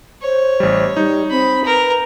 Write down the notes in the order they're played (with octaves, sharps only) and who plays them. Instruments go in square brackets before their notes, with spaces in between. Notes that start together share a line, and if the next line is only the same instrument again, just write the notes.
[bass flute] C5 [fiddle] C#5
[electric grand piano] A1 G3
[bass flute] G3 [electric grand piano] D#4
[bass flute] C4 [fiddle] B5
[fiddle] A#4 [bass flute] B4